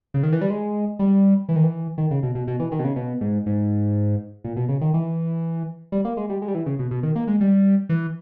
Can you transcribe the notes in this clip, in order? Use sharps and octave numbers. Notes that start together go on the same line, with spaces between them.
C#3
D#3
E3
G3
G#3
G3
E3
D#3
E3
D#3
C#3
B2
B2
B2
E3
D#3
B2
C#3
B2
G#2
G#2
A#2
B2
C#3
D#3
E3
G3
A#3
G#3
G3
G#3
G3
E3
C#3
B2
B2
D#3
A#3
G#3
G3
E3